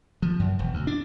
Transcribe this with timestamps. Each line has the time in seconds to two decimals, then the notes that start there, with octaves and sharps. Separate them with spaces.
0.22 F3
0.39 F#2
0.59 E1
0.74 D2
0.87 D4